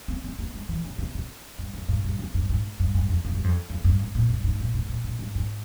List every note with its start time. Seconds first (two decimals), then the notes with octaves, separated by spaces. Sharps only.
0.08 C4
0.24 C4
0.39 A#3
0.54 G#3
0.69 E3
0.85 C#3
0.98 C3
1.15 C3
1.59 G2
1.74 F2
1.89 G#2
2.04 G2
2.19 F2
2.34 G2
2.50 G#2
2.80 G2
2.94 G2
3.09 F2
3.25 F2
3.35 G2
3.44 F2
3.70 F2
3.84 G2
3.99 G#2
4.15 A#2
4.29 G2
4.44 G#2
4.60 A#2
4.74 G#2
4.89 A#2
5.04 A#2
5.19 G#2
5.35 G#2